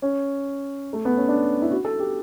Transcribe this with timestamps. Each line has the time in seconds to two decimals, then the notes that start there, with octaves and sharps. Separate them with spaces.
0.02 C#4
0.93 A3
1.05 B3
1.17 C#4
1.28 D4
1.62 E4
1.71 F#4
1.85 A4
1.99 G4